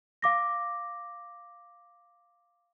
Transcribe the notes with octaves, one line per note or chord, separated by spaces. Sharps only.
F5 D6 A#6